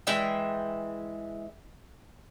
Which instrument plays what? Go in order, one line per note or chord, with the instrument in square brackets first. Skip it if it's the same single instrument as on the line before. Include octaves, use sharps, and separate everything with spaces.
[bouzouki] E3 G#3 E5 G5